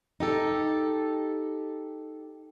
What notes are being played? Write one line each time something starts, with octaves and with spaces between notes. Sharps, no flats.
D#4 G4 A4